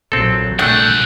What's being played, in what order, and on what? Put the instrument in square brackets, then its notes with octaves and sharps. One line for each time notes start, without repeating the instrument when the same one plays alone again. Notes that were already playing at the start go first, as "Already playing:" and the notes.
[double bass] A#1 F#3 [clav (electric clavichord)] C4 A4
[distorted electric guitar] C2 F#5 [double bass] A#2 [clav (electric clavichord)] A3 D4 [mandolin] G6